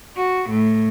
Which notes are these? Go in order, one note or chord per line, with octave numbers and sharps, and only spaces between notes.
F#4
A2